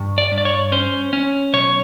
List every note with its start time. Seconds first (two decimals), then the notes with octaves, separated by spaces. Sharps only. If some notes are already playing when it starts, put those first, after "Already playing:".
Already playing: G2
0.18 D5
0.32 G2
0.38 D5
0.45 C#5
0.72 C#4 C5
1.13 C#4
1.53 B1 C#5